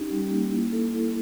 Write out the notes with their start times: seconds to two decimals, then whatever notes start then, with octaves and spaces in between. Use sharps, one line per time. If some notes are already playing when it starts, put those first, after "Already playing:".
Already playing: C#4 D#4 G4
0.10 G3
0.30 A#3
0.51 E4
0.72 A4
0.93 E4